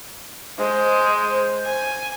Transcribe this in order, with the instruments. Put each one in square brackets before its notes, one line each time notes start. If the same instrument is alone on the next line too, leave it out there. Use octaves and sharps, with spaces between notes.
[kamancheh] G#3 [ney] C5
[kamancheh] G#5